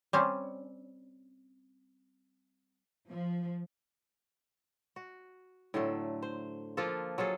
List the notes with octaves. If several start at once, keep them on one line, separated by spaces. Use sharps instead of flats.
G3 C4 C#4
F3
F#4
A2 D3 F#3 A3
C5
F3 A#3 F4 A4
F#3 F4 G#4 A4